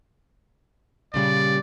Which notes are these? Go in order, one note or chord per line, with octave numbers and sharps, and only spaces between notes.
A#2 C#3 G3 D5